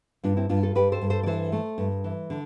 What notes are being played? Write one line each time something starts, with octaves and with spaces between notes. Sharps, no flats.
G2 D4 F4
C4 E4
G2 D4 F4
F4 A4
G2 G4 B4
A4 C5
G2
A4 C5
D5
E3 A4 C5
A3
G2
E3
D3